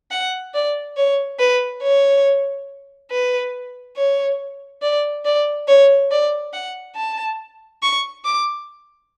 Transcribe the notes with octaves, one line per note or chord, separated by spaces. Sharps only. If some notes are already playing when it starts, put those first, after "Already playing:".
F#5
D5
C#5
B4
C#5
B4
C#5
D5
D5
C#5
D5
F#5
A5
C#6
D6